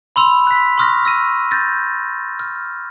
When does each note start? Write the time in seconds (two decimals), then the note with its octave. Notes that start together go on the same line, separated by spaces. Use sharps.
0.16 B5 C6 E6 F7
0.47 F#6 B6
0.78 C6 C#6 D#6 F6 F#6 A#6
1.05 E6 A#6 D#7
1.51 G6 A6 A#6
2.39 F6